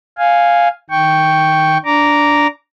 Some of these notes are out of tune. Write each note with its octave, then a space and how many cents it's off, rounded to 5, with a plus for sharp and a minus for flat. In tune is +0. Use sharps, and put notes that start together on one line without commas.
F5 +0 G#5 -5
D#3 +0 G5 -5 C#6 +0
D4 -10 A#5 +0 D6 -15